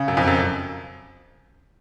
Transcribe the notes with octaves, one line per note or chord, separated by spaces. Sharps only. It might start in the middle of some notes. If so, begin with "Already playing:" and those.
Already playing: C#3
F#2
F2
F#2